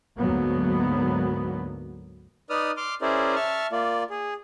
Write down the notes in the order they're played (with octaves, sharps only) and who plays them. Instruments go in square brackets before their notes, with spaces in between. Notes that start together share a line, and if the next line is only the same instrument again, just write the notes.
[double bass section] D2 G#2 F#3 A#3 B3
[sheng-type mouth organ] D#4 B4 D5 D#6 F6
C6 D6 F6
C#4 E4 G#4 A#4 C5 D5
E5 A5 C#6 F6
A#3 F4 D5
G#4